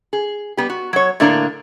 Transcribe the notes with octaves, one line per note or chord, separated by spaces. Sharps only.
G#4
G3 B3 G4
F#4
F#3 C#5
A2 D3 A#3 D4 A#5